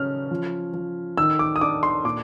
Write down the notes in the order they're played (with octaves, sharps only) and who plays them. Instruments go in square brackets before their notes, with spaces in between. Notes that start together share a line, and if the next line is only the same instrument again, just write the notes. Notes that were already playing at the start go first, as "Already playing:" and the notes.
Already playing: [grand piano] C#3 F#3 C#4 F6
F3
F3
D#3 E6
D6
D#6
D4 D6
C6
A#2 D6